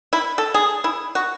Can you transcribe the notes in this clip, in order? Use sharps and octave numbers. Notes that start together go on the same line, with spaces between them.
E4
A4
G#4
E4
F#4